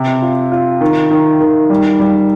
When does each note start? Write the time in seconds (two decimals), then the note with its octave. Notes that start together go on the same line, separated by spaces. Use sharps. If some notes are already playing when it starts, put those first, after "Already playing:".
Already playing: C3
0.22 F4
0.52 F4
0.81 D#3
1.11 D#3
1.41 D#3
1.70 G3
1.99 G3